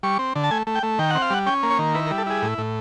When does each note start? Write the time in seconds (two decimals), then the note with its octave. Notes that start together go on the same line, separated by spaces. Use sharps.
0.03 G3 C#6
0.19 C4
0.35 D3
0.44 A5
0.51 A3 G#5
0.67 A3
0.75 G5
0.83 A3
0.99 D#3 G5
1.10 C4 F#5
1.22 F5
1.30 G3 F#5
1.46 C#4 G5
1.63 A#3
1.71 C#5
1.79 D#3
1.94 E4 B4
2.06 A#4
2.10 G3
2.18 A4
2.26 E4 G#4
2.42 A2
2.58 A2